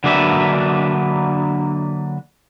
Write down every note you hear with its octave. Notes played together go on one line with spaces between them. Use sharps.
D3 F#3 A#3 D4 B4 E5